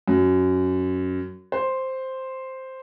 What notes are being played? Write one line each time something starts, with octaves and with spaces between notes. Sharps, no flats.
F#2
C5